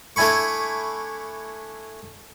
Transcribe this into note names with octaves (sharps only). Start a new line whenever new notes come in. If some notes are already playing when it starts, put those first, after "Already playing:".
A3 D4 E4 G#5 B5 C#6